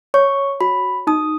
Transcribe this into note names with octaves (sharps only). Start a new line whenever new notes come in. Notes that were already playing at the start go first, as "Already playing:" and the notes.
C#5 C#6
F#4 B5
D#4 D#6